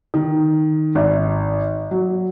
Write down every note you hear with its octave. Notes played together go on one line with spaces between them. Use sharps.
D#3
G#1
F#3